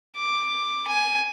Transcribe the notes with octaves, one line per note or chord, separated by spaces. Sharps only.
D6
G#5